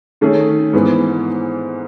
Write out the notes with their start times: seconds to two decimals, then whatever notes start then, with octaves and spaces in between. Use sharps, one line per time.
0.21 D#3 A3 C#4 G#4
0.73 G#2 E3 B3